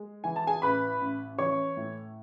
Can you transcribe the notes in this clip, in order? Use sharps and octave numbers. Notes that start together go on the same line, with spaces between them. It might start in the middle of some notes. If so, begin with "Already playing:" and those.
Already playing: G#3
E3 G#5
A5
G#4 G#5
A1 B4 B5
A1
E3 C#5 C#6
A2